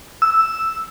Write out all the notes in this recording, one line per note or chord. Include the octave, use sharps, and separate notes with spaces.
E6